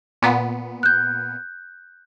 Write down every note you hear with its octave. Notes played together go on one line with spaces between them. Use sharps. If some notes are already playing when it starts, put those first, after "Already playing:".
A#2 B3
F#6 G6